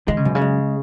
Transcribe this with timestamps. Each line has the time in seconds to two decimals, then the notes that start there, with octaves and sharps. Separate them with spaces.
0.08 D#3 G#3
0.17 C#3
0.25 F#2 B2
0.35 C#3
0.42 G#3